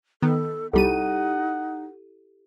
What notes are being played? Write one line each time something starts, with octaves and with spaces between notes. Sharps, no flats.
D#3 B3 A4
C2 G3 D#4 E4 G4 A4 F#5 D#7